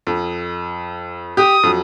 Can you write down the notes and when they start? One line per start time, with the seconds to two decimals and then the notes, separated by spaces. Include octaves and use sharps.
0.07 F2
1.37 G4 D#6
1.63 F2 F#3